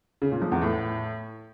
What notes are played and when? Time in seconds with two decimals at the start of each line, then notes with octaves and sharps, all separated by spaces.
0.22 C#3
0.32 A#2
0.42 F3
0.52 E2
0.62 A2